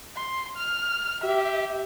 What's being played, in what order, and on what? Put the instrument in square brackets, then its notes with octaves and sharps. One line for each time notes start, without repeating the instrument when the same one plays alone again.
[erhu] C6
F6
[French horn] G4 [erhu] E5